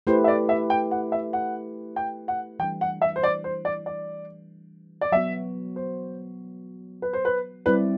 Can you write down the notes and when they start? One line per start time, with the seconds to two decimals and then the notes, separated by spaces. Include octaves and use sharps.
0.07 A3 E4 G4 B4 C5
0.24 E5
0.28 D5
0.49 E5
0.70 G5
0.91 F#5
1.12 E5
1.33 F#5
1.96 G5
2.28 F#5
2.59 E3 G3 D4 G5
2.81 F#5
3.02 E5
3.16 C5
3.23 D5
3.44 C5
3.65 D5
3.86 D5
5.01 D5
5.12 F#3 B3 F#4 E5
5.76 C5
7.02 B4
7.13 C5
7.25 B4
7.66 G3 C4 E4 G4 B4 D5